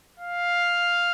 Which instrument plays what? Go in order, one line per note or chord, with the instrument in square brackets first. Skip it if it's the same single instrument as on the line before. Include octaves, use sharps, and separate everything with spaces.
[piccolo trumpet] F5